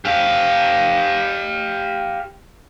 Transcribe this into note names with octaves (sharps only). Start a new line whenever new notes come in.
G4 F5